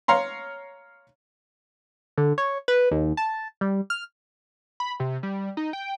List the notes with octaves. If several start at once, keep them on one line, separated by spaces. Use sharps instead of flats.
C#5 F5 A#5 C6
D3
C#5
B4
D#2
A5
G3
F6
B5
C3
G3
D#4
G5